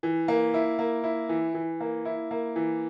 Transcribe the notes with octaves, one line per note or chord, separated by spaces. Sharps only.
E3
A#3
E4
A#3
E4
E3
E3
A#3
E4
A#3
E3